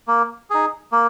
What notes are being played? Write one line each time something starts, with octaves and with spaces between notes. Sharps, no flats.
A#3
D#4 G#4
A#3